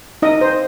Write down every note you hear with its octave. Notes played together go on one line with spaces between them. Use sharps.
D#4 D#5
C5